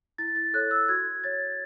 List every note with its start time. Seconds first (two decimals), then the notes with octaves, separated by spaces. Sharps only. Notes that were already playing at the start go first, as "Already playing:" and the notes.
0.18 E4 A6
0.36 A6
0.54 A4 C#5 F#6
0.71 E6
0.89 F#4 G#6
1.24 C#5 A6